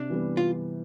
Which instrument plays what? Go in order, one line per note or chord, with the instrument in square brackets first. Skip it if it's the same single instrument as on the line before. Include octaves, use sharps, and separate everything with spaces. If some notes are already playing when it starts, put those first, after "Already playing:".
Already playing: [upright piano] C3 [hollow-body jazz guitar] D4
[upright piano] E3 G3 B3
[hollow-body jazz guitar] F4